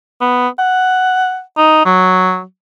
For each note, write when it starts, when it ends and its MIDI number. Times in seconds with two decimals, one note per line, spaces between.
0.21 0.48 59
0.59 1.40 78
1.57 1.82 63
1.86 2.42 54